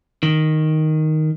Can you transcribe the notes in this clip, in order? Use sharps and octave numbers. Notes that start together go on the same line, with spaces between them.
D#3